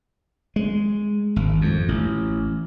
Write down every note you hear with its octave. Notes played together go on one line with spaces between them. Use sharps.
G#3
G#1
F2
A1